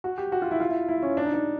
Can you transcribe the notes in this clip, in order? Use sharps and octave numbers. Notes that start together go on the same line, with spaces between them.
F#4
G4
F#4
F4
E4
F4
E4
E4
C#4
D4
D#4
D4